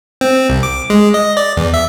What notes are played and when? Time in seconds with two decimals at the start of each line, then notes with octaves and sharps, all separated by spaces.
0.21 C4
0.50 C2
0.63 D6
0.90 G#3
1.14 D#5
1.37 D5
1.57 E2
1.74 E5